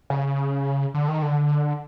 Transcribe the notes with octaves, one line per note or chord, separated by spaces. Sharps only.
C#3
D3
D#3
D3